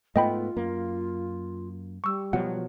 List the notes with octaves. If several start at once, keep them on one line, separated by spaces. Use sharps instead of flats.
G#2 A3 B3 F4 D#5 G5 B5
F#2 A#3
G3 C#6 E6
B2 F3 F#3 F#5